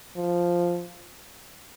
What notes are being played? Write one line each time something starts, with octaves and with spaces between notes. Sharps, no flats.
F3